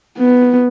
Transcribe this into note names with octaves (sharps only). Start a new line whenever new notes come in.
B3